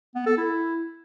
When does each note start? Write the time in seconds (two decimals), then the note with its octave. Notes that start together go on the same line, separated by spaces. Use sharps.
0.15 B3
0.26 A4
0.38 E4